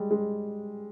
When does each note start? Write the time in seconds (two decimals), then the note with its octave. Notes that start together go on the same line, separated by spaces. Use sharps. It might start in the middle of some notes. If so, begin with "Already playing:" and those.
Already playing: G3 G#3
0.11 G#3